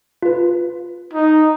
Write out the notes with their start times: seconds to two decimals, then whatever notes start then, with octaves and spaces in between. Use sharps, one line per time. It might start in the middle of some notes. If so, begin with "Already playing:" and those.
0.22 F4 B4
1.13 D#4